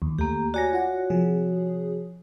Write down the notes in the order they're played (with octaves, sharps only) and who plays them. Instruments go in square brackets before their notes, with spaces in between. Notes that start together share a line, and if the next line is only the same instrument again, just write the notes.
[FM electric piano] D#2
[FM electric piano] D#2 A3 [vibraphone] A#3 G4
[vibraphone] F#4 C#5 [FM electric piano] D5 G#5 A#6
[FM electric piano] F4 F#5
C3 F3 G#4